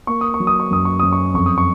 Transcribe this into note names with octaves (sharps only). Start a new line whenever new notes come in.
A#3 C#6
D#6
C#6
F#3
D#6
C#6
F#2 D#6
C#6
F#2 D#6
C#6
F2 C#6
D#6
C#6